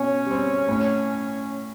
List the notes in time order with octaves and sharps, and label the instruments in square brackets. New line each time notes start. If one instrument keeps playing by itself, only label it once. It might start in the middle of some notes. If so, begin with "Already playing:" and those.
Already playing: [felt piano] B2 [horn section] C#4
[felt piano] G3 C4
A2